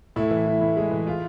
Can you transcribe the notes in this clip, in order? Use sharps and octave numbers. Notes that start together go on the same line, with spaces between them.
A2 E4
E3
E3
A2
G#3
E3
F4